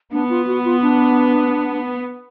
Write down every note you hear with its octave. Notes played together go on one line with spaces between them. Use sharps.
B3 D4
F4
F#4
F4
D4